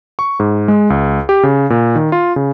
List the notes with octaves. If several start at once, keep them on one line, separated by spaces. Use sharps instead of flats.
C#6
G#2
G#3
C#2
G4
C#3
A#2
D#3
F4
C#3